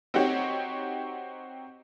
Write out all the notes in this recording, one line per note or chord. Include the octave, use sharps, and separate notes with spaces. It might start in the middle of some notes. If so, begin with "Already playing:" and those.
C4 D#4 F#4 G4 C#5